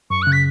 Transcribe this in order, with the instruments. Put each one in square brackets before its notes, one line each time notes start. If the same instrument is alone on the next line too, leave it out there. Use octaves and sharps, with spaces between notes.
[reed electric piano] F#2 [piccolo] C#6
[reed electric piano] C#3 [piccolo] F#6
[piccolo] B6